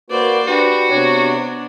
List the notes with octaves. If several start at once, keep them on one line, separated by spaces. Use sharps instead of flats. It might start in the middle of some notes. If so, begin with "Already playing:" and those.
A#3 F#4 B4 C5 D5
D4 F#4 G4 B4
C3 B3 D4 C#5